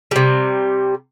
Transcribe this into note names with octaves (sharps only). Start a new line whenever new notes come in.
C3 G3